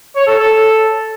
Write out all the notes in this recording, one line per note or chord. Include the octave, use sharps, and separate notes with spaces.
C#5
A4
A4